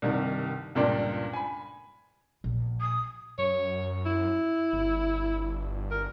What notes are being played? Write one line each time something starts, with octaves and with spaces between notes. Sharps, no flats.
C2 G2 C3 D#3
C#2 G2 A#2 D4 D5 G5
G#5 B5
A#1
D#6
F#2 C#5
E4
G1
A#4